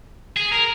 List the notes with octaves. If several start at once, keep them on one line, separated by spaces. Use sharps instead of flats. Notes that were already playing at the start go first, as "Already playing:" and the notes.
G#4
A#4